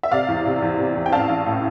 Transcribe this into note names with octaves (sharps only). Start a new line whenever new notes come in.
E5
C3 D5 F5
E2
C3
E2
C3
E2
G5
A1 F5 A5
A1
A2